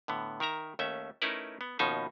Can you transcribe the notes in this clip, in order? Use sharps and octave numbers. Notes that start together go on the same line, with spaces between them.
A2 D3 B3
D#3 A#4 E5 A#5
D#2 A3 C#4 E5
A3 C#4 D#4 E4 A#4 B4
B3
D#2 B2 F3 C#4 D#4 E5